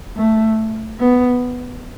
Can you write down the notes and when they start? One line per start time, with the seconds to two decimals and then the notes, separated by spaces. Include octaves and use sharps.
0.17 A3
0.99 B3